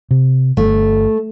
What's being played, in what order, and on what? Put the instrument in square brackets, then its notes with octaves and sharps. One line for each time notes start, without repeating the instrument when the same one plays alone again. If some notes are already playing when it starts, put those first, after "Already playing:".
[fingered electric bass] C3
[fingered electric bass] G1 [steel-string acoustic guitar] A3